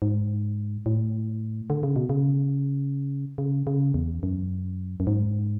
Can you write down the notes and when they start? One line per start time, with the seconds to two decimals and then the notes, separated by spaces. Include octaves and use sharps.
0.02 G#2
0.86 A2
1.70 D3
1.83 C#3
1.96 B2
2.10 C#3
3.38 C#3
3.67 C#3
3.94 E2
4.23 F#2
5.00 F#2
5.07 G#2